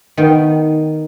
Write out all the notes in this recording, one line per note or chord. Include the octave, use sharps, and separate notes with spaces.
D#3 B3 D#4